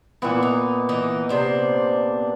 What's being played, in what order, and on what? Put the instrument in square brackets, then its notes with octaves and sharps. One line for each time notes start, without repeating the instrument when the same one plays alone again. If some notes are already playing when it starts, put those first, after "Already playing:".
[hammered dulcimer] A#2 B3 [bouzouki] E3 E4
[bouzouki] D#4
E3 D#4
C3 D4 C5